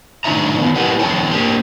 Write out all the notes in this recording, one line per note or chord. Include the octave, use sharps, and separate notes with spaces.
A2 D#3 D4 D#4 E5 A#5
D#3 B3
E4 G4 A#4 B4 D#5 F#5
E2 D3 G#4 C#5 G5 A5
A#3 D4 G4